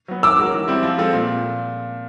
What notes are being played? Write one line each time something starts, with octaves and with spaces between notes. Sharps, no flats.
F#3 B3
D#3 D6 E6
G#3 C#4 F#4 A#4
E3
G3 C4 E4
F3
G#3 C4 F4 A4
A#2